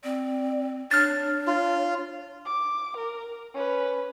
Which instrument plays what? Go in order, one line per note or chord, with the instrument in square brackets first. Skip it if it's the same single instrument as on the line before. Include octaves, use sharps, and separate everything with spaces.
[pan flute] C4 [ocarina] D5
[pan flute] D4 [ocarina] C#5 [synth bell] F6 A6
[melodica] F4
[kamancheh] D6
A#4
C#4 B4